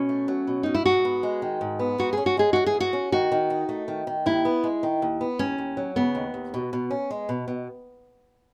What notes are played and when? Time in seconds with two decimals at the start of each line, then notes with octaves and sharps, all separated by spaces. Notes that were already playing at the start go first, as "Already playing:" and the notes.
Already playing: B2 C#4
0.09 A3
0.28 F#3
0.47 B2
0.63 B2 D#4
0.75 E4
0.86 G#2 F#4
1.05 B3
1.23 G#3
1.42 D#3
1.61 G#2
1.79 B3
1.98 G#2 F#4
2.13 C#4 G#4
2.26 F#4
2.37 G#3 G#4
2.53 E3 F#4
2.66 G#4
2.74 G#2
2.80 F#4
2.93 C#4
3.12 D#3 F#4
3.32 D#3
3.50 D#4
3.69 A3
3.88 D#3
4.07 D#3
4.26 D#2 E4
4.45 B3
4.64 G#3
4.83 D#3
5.02 D#2
5.21 B3
5.39 D#2 C#4
5.58 D#2
5.77 F#3
5.96 C#3 B3
6.15 D#2
6.34 D#2
6.54 B2
6.73 B2
6.91 C#4
7.11 G#3
7.29 B2
7.48 B2